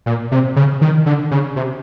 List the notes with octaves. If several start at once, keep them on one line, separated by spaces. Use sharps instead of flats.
A#2
C3
C#3
D#3
D3
C#3
C3